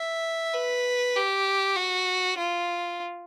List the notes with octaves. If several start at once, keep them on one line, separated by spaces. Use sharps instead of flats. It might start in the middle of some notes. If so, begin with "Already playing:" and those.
Already playing: E5
B4
G4
F#4
F4